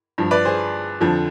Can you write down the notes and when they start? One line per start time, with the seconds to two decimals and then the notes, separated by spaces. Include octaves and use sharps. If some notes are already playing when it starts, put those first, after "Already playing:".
0.18 G2 F3
0.31 B4 D5
0.45 G#4 C5
1.01 F2 D3 F3